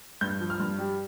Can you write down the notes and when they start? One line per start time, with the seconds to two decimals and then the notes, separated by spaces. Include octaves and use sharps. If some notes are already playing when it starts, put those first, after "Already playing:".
0.21 G2 G6
0.41 F3
0.50 F6
0.60 G2
0.79 G3